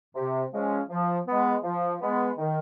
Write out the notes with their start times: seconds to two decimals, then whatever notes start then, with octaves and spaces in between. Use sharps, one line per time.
0.14 C3
0.51 F3 G#3 C#4
0.89 F3
1.26 G#3 B3
1.63 F3
2.00 G#3 B3
2.38 D#3